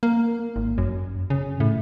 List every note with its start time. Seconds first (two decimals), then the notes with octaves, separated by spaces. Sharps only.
0.03 A#3
0.56 G#1
0.78 F#2
1.30 C#3
1.60 A2